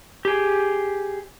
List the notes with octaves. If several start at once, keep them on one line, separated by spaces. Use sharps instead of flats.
G4 G#4